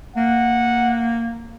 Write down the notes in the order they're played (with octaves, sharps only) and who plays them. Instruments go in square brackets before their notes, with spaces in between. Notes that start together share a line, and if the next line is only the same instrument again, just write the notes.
[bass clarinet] A#3 [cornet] F#5